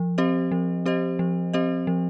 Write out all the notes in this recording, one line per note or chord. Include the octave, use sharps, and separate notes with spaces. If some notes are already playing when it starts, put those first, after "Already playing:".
Already playing: F3
C4 G4 C5 D#5
F3
C4 G4 C5 D#5
F3
C4 G4 C5 D#5
F3